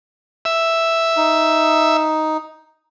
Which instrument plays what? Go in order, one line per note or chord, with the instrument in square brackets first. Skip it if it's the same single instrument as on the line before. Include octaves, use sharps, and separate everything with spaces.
[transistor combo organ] E5
[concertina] D#4